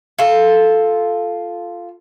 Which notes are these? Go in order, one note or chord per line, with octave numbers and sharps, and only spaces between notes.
F4 A4